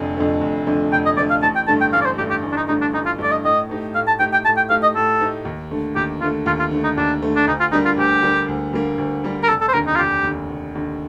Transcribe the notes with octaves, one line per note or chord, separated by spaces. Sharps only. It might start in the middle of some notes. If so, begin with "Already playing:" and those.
Already playing: F1 F2 D3 A3
F2 D3 A3
F1
F2 D3 A3
F1 G5
D#5
F2 D3 A3 D5
F5
A1 A5
G5
G2 D3 A3 A5
G5
A1 F5
D5
C5
G2 D3 A3 G4
G4
A1
D4
D#4
G2 D3 A3 D#4
D4
A1 D#4
F4
G2 D3 A3 D5
D#5
A2 D#5
A3 D#4 G4
A2 F5
A5
A3 D#4 G4 G5
G5
A2 A5
G5
A3 D#4 G4 F5
D#5
A2 A4
A3 D#4 G4
D#2
D3 A3
D#2 G4
D3 A3 F4
D#2 F4
F4
D3 A3
D#4
D#2 D4
D3 A3
D4
D2 D#4
F4
D3 G3 A#3 D#4
F4
D2 G4
D3 G3 A#3
D2
D3 G3 A#3
D2
D3 G3 A#3
A#4
F1 A4
A4
C5
D#2 D3 A#4
D#4
F4
F1 G4
D#2 D3
F1
D#2 D3